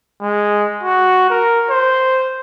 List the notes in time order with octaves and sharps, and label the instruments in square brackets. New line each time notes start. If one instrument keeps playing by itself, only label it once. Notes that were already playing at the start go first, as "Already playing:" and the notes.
[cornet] G#3
F#4
A#4
C5